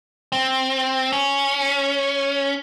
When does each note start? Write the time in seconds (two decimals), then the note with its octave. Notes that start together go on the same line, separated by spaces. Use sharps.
0.32 C4
1.13 C#4